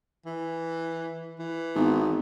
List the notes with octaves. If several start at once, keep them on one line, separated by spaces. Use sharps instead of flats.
E3
E3
G#1 B3